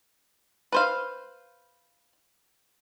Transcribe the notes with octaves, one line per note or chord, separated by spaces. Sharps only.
B4 C5 F5